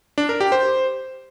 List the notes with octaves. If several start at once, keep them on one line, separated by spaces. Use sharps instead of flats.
D4
A#4
G4
C5